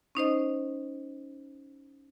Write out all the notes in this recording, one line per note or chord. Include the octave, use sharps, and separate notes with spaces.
C#4 D#4 C5 D#5